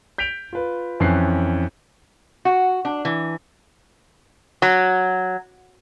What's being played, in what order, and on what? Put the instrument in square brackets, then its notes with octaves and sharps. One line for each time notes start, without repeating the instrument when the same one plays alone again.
[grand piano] G6 B6 D7 F7
F4 B4
F2 E3 C#4 F#6 C7
[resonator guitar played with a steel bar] F#4
D4
E3
F#3